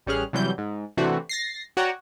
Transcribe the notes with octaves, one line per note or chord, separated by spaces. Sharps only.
A1 G3 C#4 G#4 F6 F#6
C3 E3 F#3 G3 G6
G#2
C3 E3 A3 C4 D4 F#4
A6 A#6 C7
F#4 C#5 D5 F#5 G5 A#5